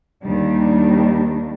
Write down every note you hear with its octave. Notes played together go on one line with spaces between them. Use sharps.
D#2 D#3 G3 D4